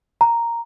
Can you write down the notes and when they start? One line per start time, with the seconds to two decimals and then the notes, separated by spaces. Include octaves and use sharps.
0.21 A#5